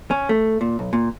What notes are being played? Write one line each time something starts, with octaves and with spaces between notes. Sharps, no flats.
C#4
A3
A#2
B1
A#2